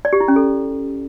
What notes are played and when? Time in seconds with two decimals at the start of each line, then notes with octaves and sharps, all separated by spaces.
0.05 D5
0.13 G4
0.20 E4
0.28 C#4
0.36 A4